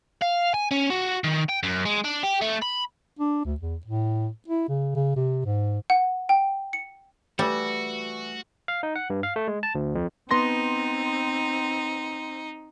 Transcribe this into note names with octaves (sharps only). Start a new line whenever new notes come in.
F5
G#5
C#4
F#4
D#3
G5
F#2
G#3
D4
G4
A3
B5
D4
D2
E2
A2
E4
C#3
C#3
C3
G#2
F#5
G5
C#7
E3 G3 A3 F#4 E6
F5
D#4
F#5
G2
F5
A3
G#3
A5
D2
F2
B3 C4 D#4 C6 A#6